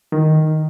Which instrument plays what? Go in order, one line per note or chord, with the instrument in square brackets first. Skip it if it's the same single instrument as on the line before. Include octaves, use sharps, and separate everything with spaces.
[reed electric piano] D#3